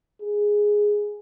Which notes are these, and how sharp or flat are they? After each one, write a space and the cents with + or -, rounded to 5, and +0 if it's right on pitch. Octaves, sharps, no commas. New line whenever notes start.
G#4 +0